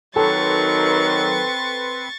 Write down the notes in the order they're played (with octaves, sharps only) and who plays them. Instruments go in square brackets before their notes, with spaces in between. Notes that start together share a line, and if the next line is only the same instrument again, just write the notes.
[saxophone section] D#3 F#3 [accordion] C4 B4 C6 [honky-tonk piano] A4 [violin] C#6 A6